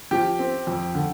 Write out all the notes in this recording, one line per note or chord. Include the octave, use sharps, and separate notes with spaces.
F3 G4
C4
F2
D3